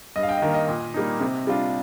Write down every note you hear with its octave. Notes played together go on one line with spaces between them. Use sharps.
G2 D#5
F5
G5
D#5
D#3 A#3 F5
D#5
A#2
G3 A#3 D#4
C3
G3 D4 F4